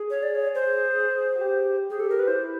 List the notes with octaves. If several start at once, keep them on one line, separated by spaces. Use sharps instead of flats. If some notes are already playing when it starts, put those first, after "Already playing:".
Already playing: G#4
C#5
D5
C#5
C5
F#4
G4
G#4
A4
A#4
B4
E4 C5